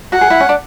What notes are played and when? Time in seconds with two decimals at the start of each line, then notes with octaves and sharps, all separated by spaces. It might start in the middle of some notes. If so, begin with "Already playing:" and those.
0.12 F#4 F#5
0.21 G#4
0.30 E4
0.40 C#4
0.49 D4